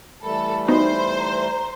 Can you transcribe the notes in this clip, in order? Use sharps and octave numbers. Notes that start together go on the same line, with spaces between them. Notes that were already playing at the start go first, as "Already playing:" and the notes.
E3 G3 A3 A4 B5
B3 D#4 F#4 C5
A#5